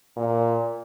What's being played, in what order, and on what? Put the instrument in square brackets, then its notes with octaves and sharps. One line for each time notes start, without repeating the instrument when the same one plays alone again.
[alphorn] A#2